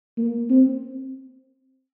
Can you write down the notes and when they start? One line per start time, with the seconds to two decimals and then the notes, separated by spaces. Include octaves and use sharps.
0.17 A#3
0.50 C4